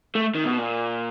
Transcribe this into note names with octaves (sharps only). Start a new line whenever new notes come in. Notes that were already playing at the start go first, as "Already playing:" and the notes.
A3
D#3
B2
A#2